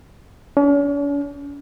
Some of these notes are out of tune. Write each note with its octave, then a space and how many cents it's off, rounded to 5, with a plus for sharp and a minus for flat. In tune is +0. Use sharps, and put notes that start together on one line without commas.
C#4 +45